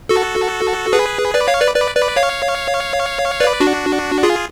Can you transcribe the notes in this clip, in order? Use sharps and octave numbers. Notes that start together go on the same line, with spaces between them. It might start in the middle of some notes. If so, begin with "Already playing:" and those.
F#4 A4
G#4 B4
B4 D5
C#5 F5
B4 D5
B4 D5
B4 D5
C#5 F5
B4 D5
D4 F#4
F4 G#4